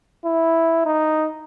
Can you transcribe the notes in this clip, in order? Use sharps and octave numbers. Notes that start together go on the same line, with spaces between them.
E4
D#4